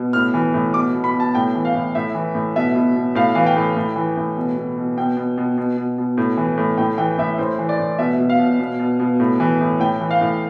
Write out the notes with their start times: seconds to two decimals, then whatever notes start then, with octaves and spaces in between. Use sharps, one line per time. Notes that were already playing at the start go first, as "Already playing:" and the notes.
Already playing: B2
0.13 A2 F6
0.34 E3
0.54 A2
0.74 B2 D6
0.94 B2
1.04 B5
1.14 B2
1.20 A5
1.35 A2 G5
1.55 E3
1.65 F5
1.75 A2
1.95 A2 E5
2.15 E3
2.35 A2
2.56 B2 E5
2.75 B2
2.96 B2
3.15 A2 F5
3.35 E3 F5
3.46 G5
3.56 A2
3.76 A2
3.96 E3
4.17 A2
4.37 B2
4.56 B2
4.77 B2
4.97 B2 G5
5.17 B2
5.38 B2
5.58 B2
5.77 B2
5.98 B2
6.17 A2
6.37 E3
6.58 A2
6.78 A2 G5
6.98 E3 G5
7.18 A2 E5
7.38 A2 C5
7.59 E3
7.69 D5
7.79 A2
7.98 B2 E5
8.19 B2
8.30 F5
8.39 B2
8.60 B2
8.79 B2
8.99 B2
9.20 A2
9.40 E3
9.61 A2
9.80 A2 G5
10.01 E3
10.11 F5
10.21 A2